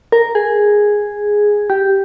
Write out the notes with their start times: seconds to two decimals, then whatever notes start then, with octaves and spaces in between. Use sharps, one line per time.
0.12 A#4
0.35 G#4
1.70 G4